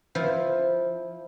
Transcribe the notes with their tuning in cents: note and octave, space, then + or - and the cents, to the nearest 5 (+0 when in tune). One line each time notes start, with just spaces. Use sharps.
F3 +0 E4 -10